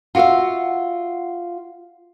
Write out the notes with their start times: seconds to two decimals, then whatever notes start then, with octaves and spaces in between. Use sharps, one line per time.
0.15 F4 F#4 D5 E5 F5